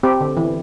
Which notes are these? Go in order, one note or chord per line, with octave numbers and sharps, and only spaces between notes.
C4 G4
D3
E3